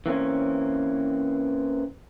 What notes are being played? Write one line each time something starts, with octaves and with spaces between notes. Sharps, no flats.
E3 A#3 C4 C#4